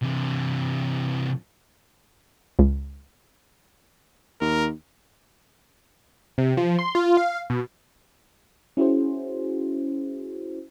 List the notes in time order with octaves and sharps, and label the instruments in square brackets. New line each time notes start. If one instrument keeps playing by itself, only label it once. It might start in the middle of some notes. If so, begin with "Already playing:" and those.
[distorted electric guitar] C3 E3
[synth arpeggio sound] C#2
[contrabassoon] D#2 [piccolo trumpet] A#4
[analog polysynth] C3
F3
C6
F4
F5
B2
[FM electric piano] C#4 E4 F#4 G#4 C5